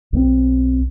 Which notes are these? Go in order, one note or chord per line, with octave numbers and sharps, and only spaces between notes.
B1 G3 C4